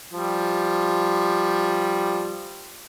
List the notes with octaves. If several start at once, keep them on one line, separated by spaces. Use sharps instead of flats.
F3 G3